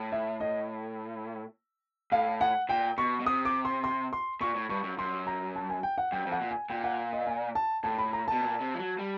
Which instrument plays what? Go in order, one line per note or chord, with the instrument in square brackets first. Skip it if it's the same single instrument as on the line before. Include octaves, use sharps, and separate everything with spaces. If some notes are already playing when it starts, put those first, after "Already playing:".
Already playing: [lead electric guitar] A2
[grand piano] E5
D#5
[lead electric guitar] A2 [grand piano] F5
[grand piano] F#5
[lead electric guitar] A#2 [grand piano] G5
[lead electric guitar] B2 [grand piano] C#6
[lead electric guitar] B2
[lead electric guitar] C3 [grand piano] D#6
[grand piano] D6
C6
C6
C6
[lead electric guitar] A#2 [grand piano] C#6
[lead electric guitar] A2
[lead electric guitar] G2 [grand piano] C#6
[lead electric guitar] F#2
[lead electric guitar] F#2 [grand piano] C6
[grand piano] A#5
A5
G#5
G5
F#5
[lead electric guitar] F#2 [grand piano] G5
[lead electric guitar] F2
[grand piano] F#5
[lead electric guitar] A#2
[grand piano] G#5
[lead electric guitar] A#2 [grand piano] G5
[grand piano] F#5
D#5
G#5
A5
[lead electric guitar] A2 [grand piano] A5
[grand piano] B5
A#5
[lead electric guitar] B2 [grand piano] A5
[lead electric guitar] A#2
C3
F3
F#3
G3